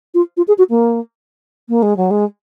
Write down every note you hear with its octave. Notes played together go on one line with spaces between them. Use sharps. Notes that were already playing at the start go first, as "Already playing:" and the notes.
F4
F4
G#4
F#4
A#3
A#3
G#3
F#3
G#3